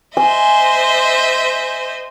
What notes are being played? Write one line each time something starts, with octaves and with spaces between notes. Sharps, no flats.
C5 D#5 E5 G#5